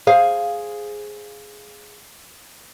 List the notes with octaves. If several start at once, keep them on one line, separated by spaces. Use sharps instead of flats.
G#4 C5 F5